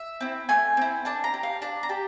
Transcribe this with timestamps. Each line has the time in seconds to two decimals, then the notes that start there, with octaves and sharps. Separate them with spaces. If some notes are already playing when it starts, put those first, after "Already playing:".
Already playing: E5
0.21 C4 E4
0.49 A3 G#5
0.77 C4 E4
1.05 D4 A5
1.24 A#5
1.34 G4
1.43 F5
1.62 D4
1.83 A#5
1.89 G4 A5